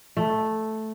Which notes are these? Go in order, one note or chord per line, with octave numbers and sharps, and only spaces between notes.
A3